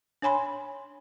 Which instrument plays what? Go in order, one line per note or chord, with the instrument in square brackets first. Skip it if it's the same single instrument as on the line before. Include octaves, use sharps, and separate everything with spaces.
[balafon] D4 C#5 G#5 B5 C6